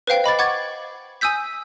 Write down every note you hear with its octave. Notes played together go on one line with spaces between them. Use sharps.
B4 C5 F5 G5
D#5 B5 D6 A6
F#5 C#6 D6 G#6 A6
G#5 D#6 E6 G6 B6